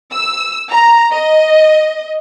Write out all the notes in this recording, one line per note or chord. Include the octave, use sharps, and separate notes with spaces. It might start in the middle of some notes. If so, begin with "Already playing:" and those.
E6
A#5
D#5